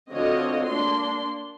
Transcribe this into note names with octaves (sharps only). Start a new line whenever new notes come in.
D3 C4 F4 F#4 C#5 D#5
A#3 D4 C6